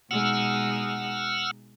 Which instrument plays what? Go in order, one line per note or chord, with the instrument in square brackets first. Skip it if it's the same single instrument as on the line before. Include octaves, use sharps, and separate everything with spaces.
[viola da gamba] B2 G#3 D#4 [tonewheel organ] F#5 E6 F6